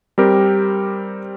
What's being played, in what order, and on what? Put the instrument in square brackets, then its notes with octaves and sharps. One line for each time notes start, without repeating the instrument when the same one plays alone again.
[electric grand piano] G3 C4 G4 A#4